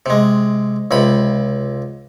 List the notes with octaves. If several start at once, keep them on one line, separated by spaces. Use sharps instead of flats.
C3 G#3
C#2 C3 B5